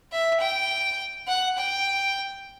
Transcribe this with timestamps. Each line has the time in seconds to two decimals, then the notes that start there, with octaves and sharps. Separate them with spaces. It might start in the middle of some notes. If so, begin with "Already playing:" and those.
0.12 E5
0.40 G5
1.27 F#5
1.58 G5